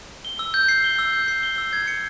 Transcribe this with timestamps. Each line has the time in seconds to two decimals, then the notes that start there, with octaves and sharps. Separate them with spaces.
0.25 G7
0.39 E6
0.54 G6
0.68 C7
0.84 G7
0.99 E6
1.13 G6
1.28 C7
1.43 G7
1.58 E6
1.73 G#6
1.88 C#7